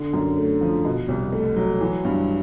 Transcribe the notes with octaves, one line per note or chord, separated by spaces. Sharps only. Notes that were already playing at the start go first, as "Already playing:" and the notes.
Already playing: D3
F#2
A3
F3
B2
C2
A3
F#3
E3
G2